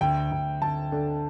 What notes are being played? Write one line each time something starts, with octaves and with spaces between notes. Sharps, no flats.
D2 G5
D2
D2 A5
D3